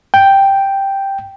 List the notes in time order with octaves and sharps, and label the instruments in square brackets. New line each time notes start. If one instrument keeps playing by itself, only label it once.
[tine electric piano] G5